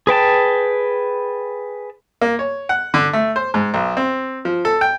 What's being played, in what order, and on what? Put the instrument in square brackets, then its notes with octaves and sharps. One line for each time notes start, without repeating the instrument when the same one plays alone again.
[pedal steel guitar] G#4 B4 G5 A5
[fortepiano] A#3
C#5
F#5
D3
A3
C5
G#2
B1
C4
F3
A4
G5